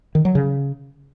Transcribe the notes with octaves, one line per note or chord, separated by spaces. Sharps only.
D#3
F#3
C#3